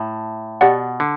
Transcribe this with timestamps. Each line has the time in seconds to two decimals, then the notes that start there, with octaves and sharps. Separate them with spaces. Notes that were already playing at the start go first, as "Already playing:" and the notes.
Already playing: A2
0.61 B2 G4 D5 F#5
1.00 D3